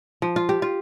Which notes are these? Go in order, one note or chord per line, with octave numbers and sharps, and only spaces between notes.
F3
F4
G4
F4